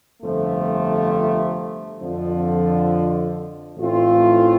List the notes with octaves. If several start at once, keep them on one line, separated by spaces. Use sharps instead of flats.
G1 F2 C3 F3 A3
F2 D3 F3
A1 A2 A3 C4 F4